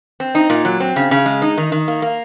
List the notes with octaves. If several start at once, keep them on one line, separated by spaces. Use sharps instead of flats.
C4
D#4
A#2
F#3
C4
C#3
C#3
G#3
D#4
D#3
D#3
A#3
A#3